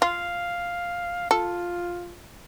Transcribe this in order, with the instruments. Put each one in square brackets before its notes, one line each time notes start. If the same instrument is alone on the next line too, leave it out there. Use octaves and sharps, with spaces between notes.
[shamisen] F4 [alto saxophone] F5
[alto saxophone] F4 [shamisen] A4